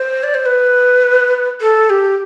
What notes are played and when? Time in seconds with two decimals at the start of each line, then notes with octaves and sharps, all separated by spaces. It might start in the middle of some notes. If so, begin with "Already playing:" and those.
Already playing: C5
0.23 D5
0.35 C5
0.46 B4
1.61 A4
1.90 G4